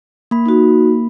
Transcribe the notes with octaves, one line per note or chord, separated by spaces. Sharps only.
A#3 B5
D#4 F#4